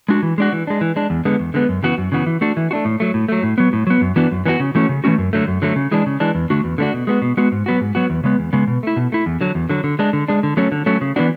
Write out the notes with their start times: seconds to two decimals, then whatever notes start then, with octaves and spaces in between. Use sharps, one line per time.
0.09 G#3 D4 F#4
0.23 E3
0.38 G#3 D4 F#4
0.52 E3
0.67 G#3 D4
0.81 E3
0.96 G#3 D4
1.10 E2
1.25 D3 G#3 B3
1.39 E2
1.54 D3 G#3 B3
1.69 F#2
1.83 C#3 E3 B3 F#4
1.98 F#2
2.12 C#3 E3 B3 F#4
2.26 E3
2.41 A3 D4 F#4
2.57 E3
2.71 A3 D4 F#4
2.85 A2
3.00 F#3 A3
3.14 A2
3.29 F#3 A3
3.43 A2
3.58 F#3 B3
3.73 A2
3.87 F#3 B3
4.01 F#2
4.16 E3 B3 D4 F#4
4.31 F#2
4.46 E3 B3 D4 F#4
4.60 C#3
4.75 E3 A3 C#4 F#4
4.89 C#3
5.04 E3 A3 C#4 F#4
5.18 F#2
5.33 D3 F#3 A3
5.48 F#2
5.62 D3 F#3 A3
5.76 C#3
5.91 E3 G#3 D4
6.06 C#3
6.20 E3 G#3 D4
6.35 E2
6.50 D3 A3 D4 F#4
6.64 E2
6.78 D3 A3 D4 F#4
6.93 B2
7.07 G#3 B3 F#4
7.22 B2
7.37 G#3 B3 F#4
7.52 G#2
7.66 F#3 B3 F#4
7.81 G#2
7.95 F#3 B3 F#4
8.10 E2
8.24 C#3 G#3 B3
8.39 E2
8.53 C#3 G#3 B3
8.67 B2
8.83 A3 E4
8.96 B2
9.12 A3 E4
9.26 E2
9.41 D3 F#3
9.55 E2
9.69 D3 F#3
9.84 D3
9.99 G#3 D4
10.13 D3
10.28 G#3 D4
10.43 D3
10.57 F#3 A3 C#4
10.72 D3
10.86 F#3 A3 C#4
11.01 C#3
11.16 E3 B3 D4 F#4